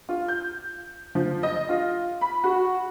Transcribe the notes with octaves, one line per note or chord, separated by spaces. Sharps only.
F4
G6
F3
D#5
F4
B5
F#4